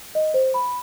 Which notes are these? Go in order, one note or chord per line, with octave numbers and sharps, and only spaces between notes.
D#5
C5
B5